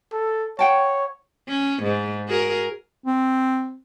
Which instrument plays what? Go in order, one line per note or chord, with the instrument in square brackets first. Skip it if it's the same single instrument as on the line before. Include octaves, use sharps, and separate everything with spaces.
[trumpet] A4
[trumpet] C#5 [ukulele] F#5 G5 A5
[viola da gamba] C#4
G#2
F#4 G#4 A#4
[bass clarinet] C4